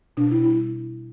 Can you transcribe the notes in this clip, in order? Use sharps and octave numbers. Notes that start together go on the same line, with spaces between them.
B2 D4
E4
G3 E4